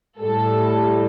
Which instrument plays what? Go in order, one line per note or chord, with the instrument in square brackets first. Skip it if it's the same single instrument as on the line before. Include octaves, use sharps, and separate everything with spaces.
[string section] A2 G3 A4